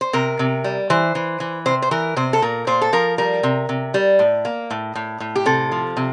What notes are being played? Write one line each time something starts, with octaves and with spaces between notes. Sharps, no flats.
C5
C3 A#4
C3
G3
E3 C5
E3
E3
C3 C5
C5
E3 A#4
C3 C5
A4
A#2 A#4
A#2 C5
A4
F3 A#4
G3 A#4
C3
C3
G3
A2
A#3
A2
A2
A2
G4
C3 A4
F3
C3